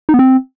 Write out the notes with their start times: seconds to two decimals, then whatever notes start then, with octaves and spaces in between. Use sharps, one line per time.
0.09 D#4
0.14 B3
0.19 C4